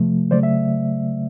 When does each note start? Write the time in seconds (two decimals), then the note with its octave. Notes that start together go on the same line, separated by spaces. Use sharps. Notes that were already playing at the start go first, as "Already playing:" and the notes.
Already playing: C3 F3 A3
0.31 C#3 F#3 A3 C5 D5
0.43 E5